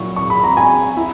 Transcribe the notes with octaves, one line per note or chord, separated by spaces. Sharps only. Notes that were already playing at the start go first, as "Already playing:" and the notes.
Already playing: A#2 F#3 E4 C#6
C#6
B5
A#5
G#5
E4